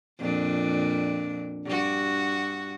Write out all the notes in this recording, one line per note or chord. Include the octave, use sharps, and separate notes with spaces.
F2 A#2 D4
G2 F#4